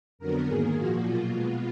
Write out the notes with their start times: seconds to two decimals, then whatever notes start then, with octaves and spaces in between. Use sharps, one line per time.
0.19 F2 D3 F#3 B3 A#4
0.47 G#2 D#3 A#3 G#4
0.76 A#2 F3 A#3 F#4
1.04 B2 F#3 A#3 F4
1.33 B2 G#3 B3